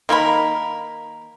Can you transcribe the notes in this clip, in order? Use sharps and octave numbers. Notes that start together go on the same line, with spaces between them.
D#3 A#3 A#4 B5